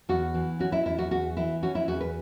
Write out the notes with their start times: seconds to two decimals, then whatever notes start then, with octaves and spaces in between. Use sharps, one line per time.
0.09 E2 F#4
0.34 E3
0.59 C#4 F#4
0.72 E4
0.85 E2 E4
0.98 F#4
1.11 E2 F#4
1.37 E3 E4
1.63 C#4 F#4
1.75 E4
1.88 E2 F#4
2.00 B4